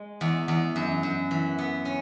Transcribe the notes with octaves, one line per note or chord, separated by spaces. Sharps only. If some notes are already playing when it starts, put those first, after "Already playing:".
Already playing: G#3
E2
E2
F#2
F#2
E3
B3
C#4